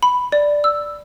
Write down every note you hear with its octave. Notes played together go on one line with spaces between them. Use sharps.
B5
D5
E6